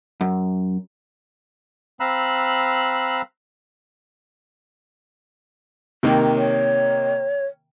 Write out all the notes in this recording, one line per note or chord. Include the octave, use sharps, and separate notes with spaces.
F#2
C4 F5 A#5 B5 E6 F#6
C3 D#3 A#3
C#5